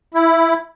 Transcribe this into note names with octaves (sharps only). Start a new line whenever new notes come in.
E4